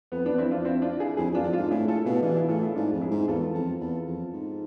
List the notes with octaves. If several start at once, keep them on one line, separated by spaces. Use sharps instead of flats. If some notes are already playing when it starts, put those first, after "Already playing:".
F2 B3
E2 B3 D4
F2 C4 E4
D4 F4
C4 E4
D4 F4
E4 G#4
F2 E4 G#4
E2 D4 F4
F2
G#2 D4 F4
A2 E4 G#4
A2 F4 A4
B2 E4 G#4
E3 D4 F4
E4 G#4
A2 F4 A4
E4 G#4
G#2 D4 F4
F2
E4 G#4
G#2
E2 F4 A4
F2
E2
F2
G#2